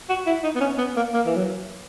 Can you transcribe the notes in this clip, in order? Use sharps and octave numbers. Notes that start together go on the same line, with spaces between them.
F#4
E4
D#4
B3
C#4
B3
A#3
A#3
E3
F#3